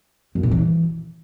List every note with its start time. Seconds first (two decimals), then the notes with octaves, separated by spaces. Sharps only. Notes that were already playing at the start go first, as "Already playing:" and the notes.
0.35 F#2
0.43 A#2
0.51 E3